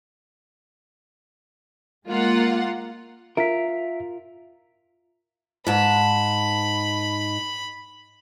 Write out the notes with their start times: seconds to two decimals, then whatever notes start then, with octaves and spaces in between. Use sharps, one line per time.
2.08 G#3 A#3 F4 F#5
3.37 F4 A#4 E5 B6
5.67 G#2 A5 B5